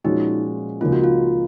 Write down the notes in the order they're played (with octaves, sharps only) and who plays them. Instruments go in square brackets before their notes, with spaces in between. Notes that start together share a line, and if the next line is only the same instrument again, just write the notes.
[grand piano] A#2 F3 G#3 C#4 F#4 [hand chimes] D#4
[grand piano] C#2 C#3 F3 A#3 D#4 [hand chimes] F4
[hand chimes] F#4
F4